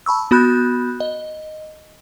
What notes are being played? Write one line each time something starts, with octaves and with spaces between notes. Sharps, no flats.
A5 B5 C#6 E6
B3 F#4 B5 F#6 G6
D#5